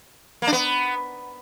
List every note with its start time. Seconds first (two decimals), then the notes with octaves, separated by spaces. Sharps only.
0.42 A#3
0.47 D4
0.53 B3